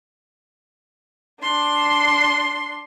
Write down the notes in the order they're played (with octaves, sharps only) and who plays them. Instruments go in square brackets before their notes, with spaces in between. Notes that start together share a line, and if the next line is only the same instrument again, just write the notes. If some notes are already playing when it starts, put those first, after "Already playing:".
[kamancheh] D4 C6